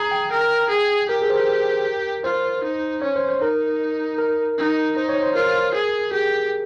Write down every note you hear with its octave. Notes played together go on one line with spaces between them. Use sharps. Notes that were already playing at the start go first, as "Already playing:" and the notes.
Already playing: G#4 A#5
G5
A#4 G5
G#4
G4 A#4
G#4
C5
A#4
F4 C5
D#4
C#4 C#5
C5
C5
D#4 A#4
A#4
D#4
D#4 C5
C#5
C5
F4 A#4
G#4
G4 G#4